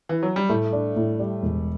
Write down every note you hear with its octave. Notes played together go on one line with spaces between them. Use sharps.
E3
F#3
G3
A2 A3
D4
A2
G3
E1